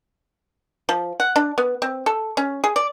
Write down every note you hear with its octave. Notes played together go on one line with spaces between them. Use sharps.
F3
F#5
D4
B3
C4
A4
C#4
G#4
D5